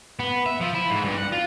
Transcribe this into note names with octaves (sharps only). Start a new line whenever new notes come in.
B3
E5
F3
E4
G#2
G2
F#5
F4